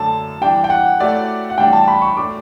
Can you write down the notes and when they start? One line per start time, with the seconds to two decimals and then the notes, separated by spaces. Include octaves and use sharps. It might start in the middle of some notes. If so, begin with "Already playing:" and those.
Already playing: F#2 D3 A3 D4 A4 A5
0.41 E3 G3 D4 G5
0.64 G5
0.70 F#5
1.00 F#3 A3 E4 G4 D5
1.50 F#5
1.58 A2 E3 G3 D4 G5
1.73 A5
1.88 B5
2.02 C#6
2.17 A2 F#3 A3 D4 D6